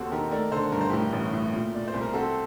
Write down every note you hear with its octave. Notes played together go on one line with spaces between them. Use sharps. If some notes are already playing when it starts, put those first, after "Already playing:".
Already playing: D#2 C4 F#4 G4 A4
D#3 G4 A#4
A3 A#4 D5
D3 A4 C5
G2 A#4
C5
A2 G4 A#4
A1
A2
A#2
A#2 D5
C5
C2
A#4
C4 F#4 A4